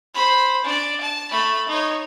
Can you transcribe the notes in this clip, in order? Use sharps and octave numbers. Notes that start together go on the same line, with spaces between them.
C5 B5
D4 D5
A5
A3 B5
D#4 C#5